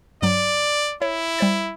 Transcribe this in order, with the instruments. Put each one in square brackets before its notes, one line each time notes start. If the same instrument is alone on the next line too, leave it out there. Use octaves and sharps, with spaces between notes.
[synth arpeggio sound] G2 F#3 [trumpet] D5
[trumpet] E4 [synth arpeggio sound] C#5
[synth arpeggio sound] G3 C5 A6